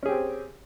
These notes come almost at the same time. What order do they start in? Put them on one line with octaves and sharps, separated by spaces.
C#4 G#4 G4 C4